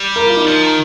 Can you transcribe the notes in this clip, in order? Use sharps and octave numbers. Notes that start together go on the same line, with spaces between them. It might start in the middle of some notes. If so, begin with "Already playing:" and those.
Already playing: G3
A#4
F4
D#4
F3
D#3